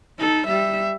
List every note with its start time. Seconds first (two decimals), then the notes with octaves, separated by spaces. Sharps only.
0.18 D#4 A4
0.48 G3 E5